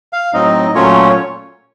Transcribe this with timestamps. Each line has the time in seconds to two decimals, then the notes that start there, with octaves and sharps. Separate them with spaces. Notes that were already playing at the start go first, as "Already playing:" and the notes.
0.13 F5
0.34 A2 F#3 C4 D#4 D#5
0.75 A#2 F#3 A3 C#4 F4 C#5